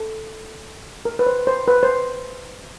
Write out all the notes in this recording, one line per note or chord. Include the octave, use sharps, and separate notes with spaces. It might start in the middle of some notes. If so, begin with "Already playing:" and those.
Already playing: A4
A#4
B4
C5
C5
B4
C5